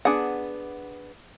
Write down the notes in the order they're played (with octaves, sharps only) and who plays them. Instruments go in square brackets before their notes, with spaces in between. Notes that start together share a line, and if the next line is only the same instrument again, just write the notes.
[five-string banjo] B3 D4 G#4 F#5